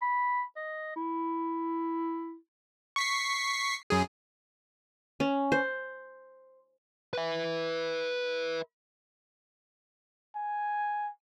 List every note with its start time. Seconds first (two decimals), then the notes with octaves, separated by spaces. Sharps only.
0.02 B5
0.56 D#5
0.96 E4
2.96 C#6 B6 C7
3.90 F#2 G#4
5.20 C#4
5.52 C5
7.13 B4 E5
10.36 G#5